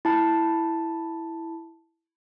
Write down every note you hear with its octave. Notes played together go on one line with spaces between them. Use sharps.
E4 A5